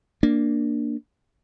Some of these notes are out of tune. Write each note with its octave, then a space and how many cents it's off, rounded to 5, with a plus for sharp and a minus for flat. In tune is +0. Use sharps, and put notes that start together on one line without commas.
A#3 +0 D4 +0